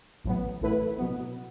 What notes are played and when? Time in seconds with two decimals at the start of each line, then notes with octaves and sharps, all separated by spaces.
0.24 A1 A2 F#3 B3
0.61 A1 A2 A3 E4 B4
0.98 B2 F#3 B3